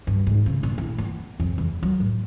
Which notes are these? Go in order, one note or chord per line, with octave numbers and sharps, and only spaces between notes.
G2
G#2
C#3
A#1
E4
B3
F2
E2
F#3
A2